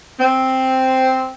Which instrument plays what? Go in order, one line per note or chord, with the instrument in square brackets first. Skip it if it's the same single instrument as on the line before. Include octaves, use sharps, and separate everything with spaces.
[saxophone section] C4